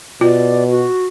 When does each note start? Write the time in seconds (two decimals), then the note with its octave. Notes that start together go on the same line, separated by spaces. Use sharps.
0.21 B2 F4 D5
0.70 F#4